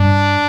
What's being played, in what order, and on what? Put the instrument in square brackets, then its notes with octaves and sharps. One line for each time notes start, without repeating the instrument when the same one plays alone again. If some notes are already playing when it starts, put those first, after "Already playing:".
Already playing: [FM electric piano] G2 [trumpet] D4